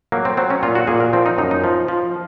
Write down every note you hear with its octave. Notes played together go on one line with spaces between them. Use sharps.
F#3 A#3
C4
F#3 C4
C#4
A#2 F4
F#4
A#2 G#4
A#4
F3 C4
D#4
F#2 D#4
D#4
F3
F3